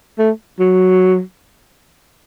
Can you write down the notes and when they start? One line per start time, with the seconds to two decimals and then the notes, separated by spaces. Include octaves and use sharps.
0.19 A3
0.59 F#3